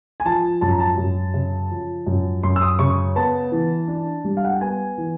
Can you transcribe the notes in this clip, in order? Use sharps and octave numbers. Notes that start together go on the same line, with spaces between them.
G#5
F3 A5
F#2 A5
A#5
A5
F#2
C#3
F3
F#2
F#2 C6
E6
D#6
C#3 C#6
B3 A5
E3
D4
G3
F5
F#5
G5
B3 G#5
E3